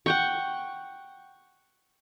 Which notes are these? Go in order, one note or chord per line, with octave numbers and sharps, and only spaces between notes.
F#5 G5 C#6